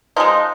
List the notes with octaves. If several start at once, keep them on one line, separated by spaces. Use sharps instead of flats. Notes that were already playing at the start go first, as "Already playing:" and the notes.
F3 G#3 D#4